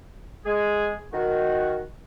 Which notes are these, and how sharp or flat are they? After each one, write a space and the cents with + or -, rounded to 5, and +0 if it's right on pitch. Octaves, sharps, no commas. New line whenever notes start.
G#3 +0 G#4 +0
D#3 +0 F#4 +0